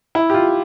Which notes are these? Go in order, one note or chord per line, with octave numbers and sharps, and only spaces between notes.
E4
G4
F4